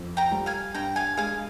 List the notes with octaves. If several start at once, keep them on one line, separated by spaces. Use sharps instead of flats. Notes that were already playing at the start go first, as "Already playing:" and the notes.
Already playing: F2 F3
G5 A#5
G3
F5 G#5
G2 G5 A#5
F5 G#5
G#3 F5 G#5